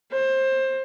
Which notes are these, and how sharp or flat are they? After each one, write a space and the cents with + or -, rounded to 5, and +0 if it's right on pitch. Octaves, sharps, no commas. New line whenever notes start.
C5 +20